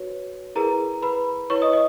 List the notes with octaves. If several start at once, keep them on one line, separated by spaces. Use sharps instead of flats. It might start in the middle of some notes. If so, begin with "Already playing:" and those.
Already playing: F#4 B4 C#5
E4 G#4 A#4 B4 A#5
B4 B5
E4 B4 C#5 C#6
D#5 D#6
D#5